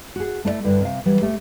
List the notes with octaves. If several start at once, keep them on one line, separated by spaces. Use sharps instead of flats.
F#4 G#4
A3 E4 C5 D5 E5
G2 D3 E4
C3 F5
E3 F#3 G3
A3 G4